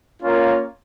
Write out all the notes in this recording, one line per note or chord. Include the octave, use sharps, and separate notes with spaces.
A#3 C#4 F4 A#4 C#5